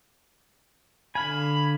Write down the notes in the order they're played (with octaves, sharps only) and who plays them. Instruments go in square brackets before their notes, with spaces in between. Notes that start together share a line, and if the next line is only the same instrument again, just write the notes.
[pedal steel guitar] D3 F5 G#5 [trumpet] B5